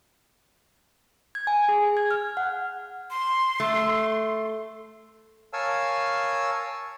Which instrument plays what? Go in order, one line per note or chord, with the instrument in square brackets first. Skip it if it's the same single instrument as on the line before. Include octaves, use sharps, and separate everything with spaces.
[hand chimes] G#6
G#5
G#4
G#6
F6
F#5
[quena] C6
[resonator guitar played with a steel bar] A3
[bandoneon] A#4 C#5 F5 G#5 A5 E6